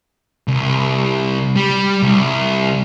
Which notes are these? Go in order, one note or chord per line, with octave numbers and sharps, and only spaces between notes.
C2
G3
C2